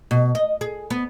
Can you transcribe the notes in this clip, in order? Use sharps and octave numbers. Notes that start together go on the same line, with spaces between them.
B2
D#5
G#4
B3